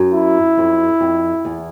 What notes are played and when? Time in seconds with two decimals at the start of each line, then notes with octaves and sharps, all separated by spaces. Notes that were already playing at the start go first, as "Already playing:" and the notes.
Already playing: F#2
0.13 E4
0.57 F2
1.01 F2
1.45 E2